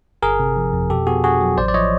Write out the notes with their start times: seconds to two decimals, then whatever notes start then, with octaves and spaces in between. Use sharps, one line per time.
0.22 G1 G#4 A#4
0.40 C3
0.57 F3
0.73 F2
0.90 B2 G4 A4
1.07 B3 F#4 G#4
1.24 D4 F#4 G#4
1.41 F#3
1.58 A1 C5 D5
1.68 D5
1.74 F3 C#5 D#5